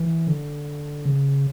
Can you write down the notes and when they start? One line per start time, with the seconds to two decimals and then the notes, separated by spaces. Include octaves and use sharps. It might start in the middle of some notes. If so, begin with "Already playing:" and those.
Already playing: E3
0.27 D3
1.05 C#3